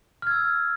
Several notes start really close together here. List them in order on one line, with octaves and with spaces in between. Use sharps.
F6 G#6 E6